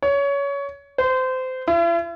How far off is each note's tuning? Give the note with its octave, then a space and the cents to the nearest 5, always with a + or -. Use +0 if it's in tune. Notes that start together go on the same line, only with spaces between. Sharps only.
C#5 +20
C5 -25
E4 +45